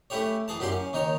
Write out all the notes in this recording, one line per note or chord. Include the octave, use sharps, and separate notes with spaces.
A3 C#4 E4 G4 C#5
E3 G#4 A5
F#2 F#3 E4 G4 D5 C6
C#4
D#2 D#3 D#4 C#5